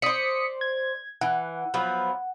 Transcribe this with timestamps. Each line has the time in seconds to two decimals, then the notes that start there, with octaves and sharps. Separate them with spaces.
0.02 C5 D5 D#6 B6 C#7
0.61 G#6
1.21 E3 F#5
1.74 F3 F#3 B3